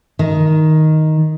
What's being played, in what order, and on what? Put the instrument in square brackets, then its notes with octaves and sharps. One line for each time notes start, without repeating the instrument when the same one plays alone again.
[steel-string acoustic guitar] D#3